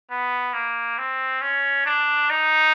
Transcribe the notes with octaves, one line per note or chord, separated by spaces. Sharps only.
B3
A#3
C4
C#4
D4
D#4